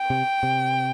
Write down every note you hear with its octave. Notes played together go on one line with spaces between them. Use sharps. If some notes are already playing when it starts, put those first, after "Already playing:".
Already playing: G5
C3
C3